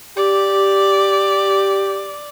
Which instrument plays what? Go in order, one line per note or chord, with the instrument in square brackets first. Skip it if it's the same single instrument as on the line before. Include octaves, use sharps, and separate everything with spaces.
[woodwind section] G4 [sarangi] D5